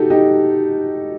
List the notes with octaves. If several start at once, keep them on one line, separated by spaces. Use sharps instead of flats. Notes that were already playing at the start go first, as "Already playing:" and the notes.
Already playing: D#4 F#4 G4 A4
D#4 G4